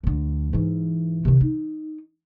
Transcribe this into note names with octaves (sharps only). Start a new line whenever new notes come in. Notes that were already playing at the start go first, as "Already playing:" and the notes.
D2 D3
G#2 E3
C3 D#3
D#4